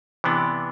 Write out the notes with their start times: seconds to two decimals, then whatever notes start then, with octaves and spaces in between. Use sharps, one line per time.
0.24 C3 E3 B3 D4